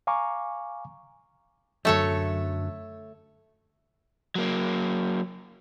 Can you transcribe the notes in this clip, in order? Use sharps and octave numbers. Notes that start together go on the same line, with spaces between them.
F5 G#5 A#5 C#6 D6
F#2 D3 F#3 A3 A4 C#5
F#3 A#3